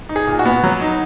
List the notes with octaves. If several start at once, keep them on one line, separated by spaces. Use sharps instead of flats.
D#4
G#4
A#2
F#4
B3
F#3
D#4